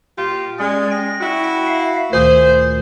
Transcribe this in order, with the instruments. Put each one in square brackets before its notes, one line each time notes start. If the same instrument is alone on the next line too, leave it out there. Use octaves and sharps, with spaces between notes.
[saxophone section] A#2 F4 G4
[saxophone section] G#3 [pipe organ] C#4 G#4 D5
[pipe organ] G5 A#6
[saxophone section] E4 F#4
[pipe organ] E5 F5
[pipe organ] D2 A#2 D#3 [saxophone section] G#4 C5